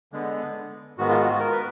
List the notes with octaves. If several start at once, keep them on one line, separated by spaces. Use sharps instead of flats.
D3 G#3 B3
G#2 D#3 G#3 B3 F#4
F4
F#4
F#4
A#4
B4